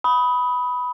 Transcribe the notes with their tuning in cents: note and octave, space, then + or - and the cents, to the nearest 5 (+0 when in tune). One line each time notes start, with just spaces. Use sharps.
B5 +0 D#6 +20